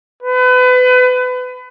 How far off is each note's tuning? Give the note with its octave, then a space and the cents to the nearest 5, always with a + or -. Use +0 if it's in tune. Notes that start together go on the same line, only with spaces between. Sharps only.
B4 +30